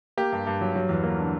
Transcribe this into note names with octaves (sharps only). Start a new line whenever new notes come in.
A#3 G4
G2
G2
F#3
F#3
E2
A#3
D3